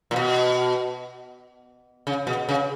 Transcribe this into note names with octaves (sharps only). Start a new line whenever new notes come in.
A#2
B2
C#3
B2
C#3